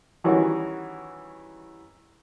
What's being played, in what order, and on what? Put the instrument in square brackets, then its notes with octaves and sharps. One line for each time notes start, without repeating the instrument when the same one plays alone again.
[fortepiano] D#3 E3 G3 C#4 F#4